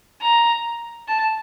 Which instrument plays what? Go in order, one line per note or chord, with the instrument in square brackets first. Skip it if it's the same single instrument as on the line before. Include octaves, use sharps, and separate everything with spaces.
[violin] A#5
A5